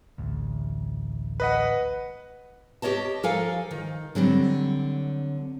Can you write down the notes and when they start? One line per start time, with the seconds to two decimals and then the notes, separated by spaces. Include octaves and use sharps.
0.18 A1 D2
1.40 B4 D#5 F#5
2.82 G4 A4 C#5 D#5 A5
3.23 F3 A4 A#4 F5 G#5
3.71 D#3
4.15 D3 F#3 G3 C4